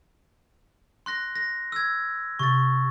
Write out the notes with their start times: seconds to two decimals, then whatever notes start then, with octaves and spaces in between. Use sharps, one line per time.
1.06 C6 F#6 A#6
1.36 A#6
1.72 E6 G#6
2.39 C3 C#6 A6